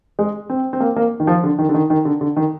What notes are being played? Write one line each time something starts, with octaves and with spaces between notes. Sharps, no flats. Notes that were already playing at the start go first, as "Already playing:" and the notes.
G#3
C4
C4
A#3
A#3
D#3
F3
D3
D#3
D3
D#3
D#3
D3
D3
D#3